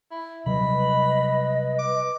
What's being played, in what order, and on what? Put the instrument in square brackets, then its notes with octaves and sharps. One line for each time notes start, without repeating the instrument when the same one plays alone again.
[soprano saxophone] E4
[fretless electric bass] C3 F#3 G3 [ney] B4 [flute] D#5 [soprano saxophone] B5
[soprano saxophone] D6